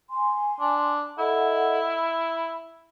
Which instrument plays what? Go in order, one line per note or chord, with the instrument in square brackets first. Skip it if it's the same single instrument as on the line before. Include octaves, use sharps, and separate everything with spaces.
[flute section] G#5 C6
[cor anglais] D4
[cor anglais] E4 [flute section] A4 D#5 F#5
[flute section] B5